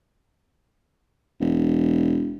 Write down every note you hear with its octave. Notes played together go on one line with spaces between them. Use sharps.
E1